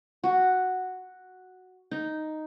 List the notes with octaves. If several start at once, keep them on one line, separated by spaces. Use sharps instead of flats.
F#4
D#4